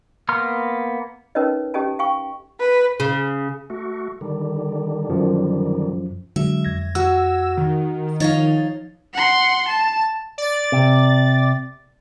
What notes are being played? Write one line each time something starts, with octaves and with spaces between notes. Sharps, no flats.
A#3 B3 C6 F6
C#4 D#4 A#4 B4 C#5 D#5
C#4 G4 A4 D#5 G#5 A5
F5 G5 G#5 C#6
B4
C#3
A3 F#4
D3 D#3 G3
F#2 F3
D3 F#3 G#3 E5
F2 G#6 A#6
F#4 E6
D#3
F3 D#4 C#5 D#5 F5 A6
F#5 C6
A5
D5 A6
C3